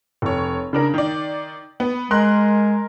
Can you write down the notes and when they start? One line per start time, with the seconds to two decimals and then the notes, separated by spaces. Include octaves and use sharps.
0.22 F1 C#5
0.73 C#3 D4 A#4
0.94 D#3 D5
1.80 B3
2.11 G#3 A#4 C6 F#6